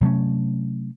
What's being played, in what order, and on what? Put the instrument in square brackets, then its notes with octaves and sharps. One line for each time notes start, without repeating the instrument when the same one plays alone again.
[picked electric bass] C3 F#3 A3 C#4